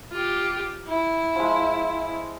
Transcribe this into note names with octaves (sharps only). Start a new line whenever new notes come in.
F4 G4
E4
F3 G#3